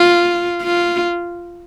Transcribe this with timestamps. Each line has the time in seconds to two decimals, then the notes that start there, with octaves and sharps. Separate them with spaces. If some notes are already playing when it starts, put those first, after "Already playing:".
Already playing: F4
0.62 F4